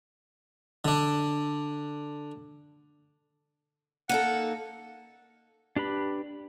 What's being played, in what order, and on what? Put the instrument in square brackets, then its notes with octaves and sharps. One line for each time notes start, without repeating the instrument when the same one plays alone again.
[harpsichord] D3 D4
[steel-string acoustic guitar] A#3 D#4 A4 [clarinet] F#5
[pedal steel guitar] D4 G4 B4 B5